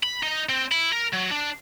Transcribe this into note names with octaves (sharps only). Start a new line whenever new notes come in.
B5
D#4
C4
E4
A#4
F#3
D4